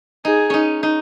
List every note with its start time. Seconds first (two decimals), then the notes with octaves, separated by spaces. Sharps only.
0.25 D#4 G#4
0.50 C#4 D#4
0.83 D#4